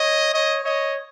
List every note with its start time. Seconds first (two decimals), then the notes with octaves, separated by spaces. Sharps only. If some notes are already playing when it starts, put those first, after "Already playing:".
Already playing: C#5 D#5
0.32 C#5 D#5
0.63 C#5 D#5